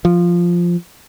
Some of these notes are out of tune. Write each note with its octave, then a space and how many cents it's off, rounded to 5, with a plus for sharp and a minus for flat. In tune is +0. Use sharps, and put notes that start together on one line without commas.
F3 -5